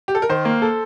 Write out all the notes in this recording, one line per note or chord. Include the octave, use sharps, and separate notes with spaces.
G4
A4
A#4
D#3 C5
A#3
A4